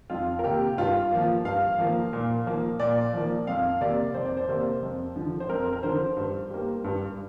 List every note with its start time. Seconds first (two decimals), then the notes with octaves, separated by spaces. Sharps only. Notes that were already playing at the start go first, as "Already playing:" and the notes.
0.10 F2 F4
0.39 A#4
0.44 C3 A#3 G4
0.78 G2 F4
1.12 F3 A#3
1.45 G2 F5
1.78 F3 A#3
2.13 A#2
2.46 F3 A#3
2.80 A#2 D5
3.13 F3 A#3
3.47 F2 F5
3.81 C3 A#3 D5
4.14 F2 C5
4.25 D5
4.37 C5
4.48 C3 A#3
4.82 F2
5.16 D3 F3
5.40 C5
5.49 F2 A#4
5.73 A#4
5.83 D3 F3 C5
6.17 G2
6.50 G3 A#3
6.84 G2